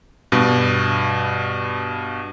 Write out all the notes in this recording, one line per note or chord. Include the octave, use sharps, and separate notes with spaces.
G2 B2